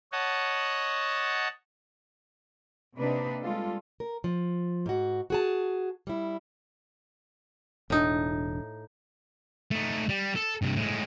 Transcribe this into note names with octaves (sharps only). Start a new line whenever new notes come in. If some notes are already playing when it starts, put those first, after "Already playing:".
C#5 D#5 F#5 A5
C3 A#3 D4 D#4 B4
G3 G#3 F4 A4
A#4
F3
G#2 F#4
F#4 G#4 A5
G3 E4
E1 A2 D4 D#4
A3 D#4
G3
A4
G2 C3
A2 G#3